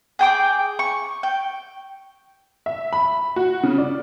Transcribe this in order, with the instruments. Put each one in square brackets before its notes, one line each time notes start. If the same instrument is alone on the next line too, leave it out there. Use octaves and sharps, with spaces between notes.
[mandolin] G#4 G5 D6
C#6
G5
[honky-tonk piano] E5
B5
F#4
C#3
D5